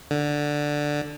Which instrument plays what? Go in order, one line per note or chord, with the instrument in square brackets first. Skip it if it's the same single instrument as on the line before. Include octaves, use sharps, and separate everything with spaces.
[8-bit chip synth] D3